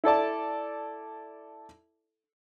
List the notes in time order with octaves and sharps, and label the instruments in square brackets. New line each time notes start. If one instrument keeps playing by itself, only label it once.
[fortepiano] E4 A4 D5 A5